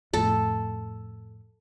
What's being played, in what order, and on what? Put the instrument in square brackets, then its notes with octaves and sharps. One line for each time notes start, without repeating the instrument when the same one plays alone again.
[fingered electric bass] F2 A2 [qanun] A4